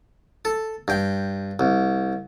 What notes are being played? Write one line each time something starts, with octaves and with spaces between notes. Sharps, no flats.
A4
G2 G5
C2